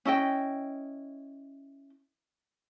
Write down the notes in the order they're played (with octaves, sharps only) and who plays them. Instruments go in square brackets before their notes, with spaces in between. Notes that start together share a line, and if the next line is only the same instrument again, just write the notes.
[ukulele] C#4 E4 D#5 G5